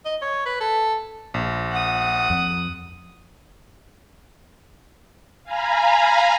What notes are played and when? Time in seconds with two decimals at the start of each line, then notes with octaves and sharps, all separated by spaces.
0.05 D#5
0.22 C#5
0.46 B4
0.60 A4
1.34 A#1
1.71 F#5 D#6
2.30 F2
5.44 F5 G#5 A#5 B5